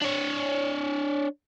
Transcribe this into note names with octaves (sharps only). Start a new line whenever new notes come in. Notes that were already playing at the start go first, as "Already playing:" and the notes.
D4 C#5